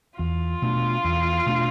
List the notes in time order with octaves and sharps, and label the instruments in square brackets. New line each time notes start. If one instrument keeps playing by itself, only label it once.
[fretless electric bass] E2 [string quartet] F4
[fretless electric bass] B2 A3 D4
E2
B2 A3 D4